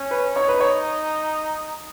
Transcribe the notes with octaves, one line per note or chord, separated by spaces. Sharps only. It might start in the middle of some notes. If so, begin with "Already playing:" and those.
Already playing: C#4
B4
D#4 C#5
B4
C#5